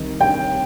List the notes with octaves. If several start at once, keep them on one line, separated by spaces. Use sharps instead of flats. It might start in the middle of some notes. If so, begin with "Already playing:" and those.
Already playing: C2 C3 D#3
G5